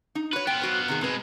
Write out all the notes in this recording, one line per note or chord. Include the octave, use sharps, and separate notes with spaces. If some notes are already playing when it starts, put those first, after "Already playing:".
D#4
F#4 B4 C#5
B3 F4 G5
F#3 F#4 C5
C3 D#3 G#4
B2 G#3 C4 B4